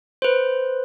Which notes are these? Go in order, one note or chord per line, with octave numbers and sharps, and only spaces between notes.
B4 C5